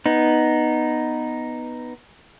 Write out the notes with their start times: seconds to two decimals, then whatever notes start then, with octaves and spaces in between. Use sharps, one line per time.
0.06 B3 D#4